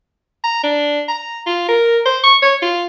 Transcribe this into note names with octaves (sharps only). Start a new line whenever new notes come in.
A#5
D4
A#5
F4
A#4
C5
C#6
C#5
F4